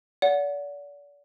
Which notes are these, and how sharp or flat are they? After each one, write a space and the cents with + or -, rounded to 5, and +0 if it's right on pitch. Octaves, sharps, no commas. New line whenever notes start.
D5 -35 F#5 -15